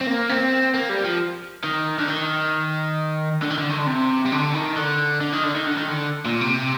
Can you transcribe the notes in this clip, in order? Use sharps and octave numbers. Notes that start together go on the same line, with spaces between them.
C4
A#3
C4
A#3
G3
F3
D#3
D3
D#3
D3
D#3
D3
D#3
D3
C3
C3
D3
D#3
D3
D3
D#3
D3
D#3
D3
D#3
D3
A#2
C3